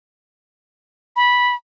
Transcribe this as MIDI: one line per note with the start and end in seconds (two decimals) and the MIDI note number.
1.16 1.55 83